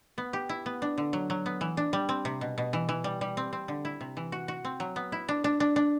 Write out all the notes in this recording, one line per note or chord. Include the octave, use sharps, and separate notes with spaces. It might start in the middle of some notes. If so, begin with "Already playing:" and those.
B3
G4
E4
B3
D4
D3
F#3
F#3
B3
E3
D4
G3
C4
C3
B2
B2
E3
E3
G3
G3
C4
C4
D3
E4
C3
E3
F#4
F#4
C4
F#3
B3
E4
D4
D4
D4
D4